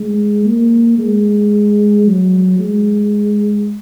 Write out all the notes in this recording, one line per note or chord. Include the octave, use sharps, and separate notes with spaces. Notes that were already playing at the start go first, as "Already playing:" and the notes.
Already playing: G#3
A#3
G#3
F#3
G#3